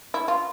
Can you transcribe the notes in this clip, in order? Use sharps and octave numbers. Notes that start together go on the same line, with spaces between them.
E4
F4